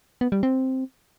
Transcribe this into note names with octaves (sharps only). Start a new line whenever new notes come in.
B3
G3
C4